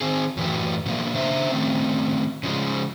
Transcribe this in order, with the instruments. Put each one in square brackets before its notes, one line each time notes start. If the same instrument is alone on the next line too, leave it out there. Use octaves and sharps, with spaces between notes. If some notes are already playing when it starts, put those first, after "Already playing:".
[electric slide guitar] D#3 C4 G#4
F#2 A2 E3 F#3 G4
B2 D3 F3 G#3 A#3 B3
C#3 D4 C5 E5 A#5
D#3 A3 C4 C#4
C#3 F3 G#3